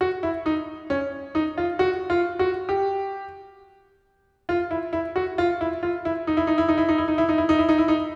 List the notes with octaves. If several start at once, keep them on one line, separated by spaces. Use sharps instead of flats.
F#4
E4
D#4
C#4
D#4
F4
F#4
F4
F#4
G4
F4
E4
E4
F#4
F4
E4
F4
E4
D#4
E4
D#4
E4
D#4
E4
D#4
E4
D#4
E4
D#4
E4
D#4
E4
D#4
E4
D#4